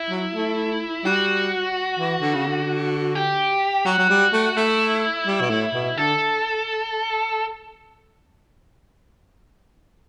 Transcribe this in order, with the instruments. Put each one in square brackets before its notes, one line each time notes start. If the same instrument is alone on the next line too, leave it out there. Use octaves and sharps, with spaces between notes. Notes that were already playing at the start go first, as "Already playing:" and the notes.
Already playing: [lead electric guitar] E4
[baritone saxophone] F#3
A3
[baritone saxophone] G3 [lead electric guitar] F#4
[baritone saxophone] E3
D3
C#3
D3
[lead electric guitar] G4
[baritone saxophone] F#3 [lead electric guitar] F#4
[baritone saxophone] F#3
G3
A3
[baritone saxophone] A3 [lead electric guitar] E4
[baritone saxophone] G3
B2
A2
B2
[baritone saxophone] D3 [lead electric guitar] A4